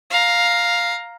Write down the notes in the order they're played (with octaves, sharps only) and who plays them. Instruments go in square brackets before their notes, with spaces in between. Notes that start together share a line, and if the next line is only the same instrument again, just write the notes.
[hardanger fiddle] F5 A#5